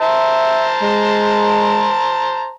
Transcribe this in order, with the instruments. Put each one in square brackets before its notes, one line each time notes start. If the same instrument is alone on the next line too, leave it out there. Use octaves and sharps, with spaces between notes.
[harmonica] C5 A5 A#5 [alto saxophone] E5
[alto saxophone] G#3